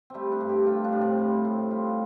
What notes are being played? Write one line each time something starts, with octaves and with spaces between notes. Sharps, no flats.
G3 A3 C4
D4
G2
G4
A3 F4
D4
A2
C4
G3
A2
G3 F4